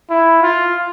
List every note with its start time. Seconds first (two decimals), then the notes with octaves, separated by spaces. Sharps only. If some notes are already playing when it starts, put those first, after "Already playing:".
0.10 E4
0.42 F4